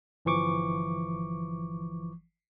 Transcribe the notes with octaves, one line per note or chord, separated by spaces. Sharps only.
G1 E3 F3 C#6 D6